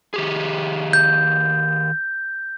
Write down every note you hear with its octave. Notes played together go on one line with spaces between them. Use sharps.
D#3 G4 G#4
G6